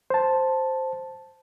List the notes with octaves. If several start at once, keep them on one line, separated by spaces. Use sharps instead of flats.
C5 A5